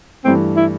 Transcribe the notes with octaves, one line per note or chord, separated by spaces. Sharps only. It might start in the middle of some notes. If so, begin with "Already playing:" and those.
G2 E3 A3 C4
E4